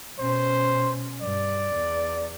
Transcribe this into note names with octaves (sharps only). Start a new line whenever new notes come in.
B2 C#4 C5
G2 D5
E2